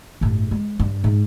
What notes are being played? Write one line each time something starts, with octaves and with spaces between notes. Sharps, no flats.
G1 A2
G#3
G2
G#2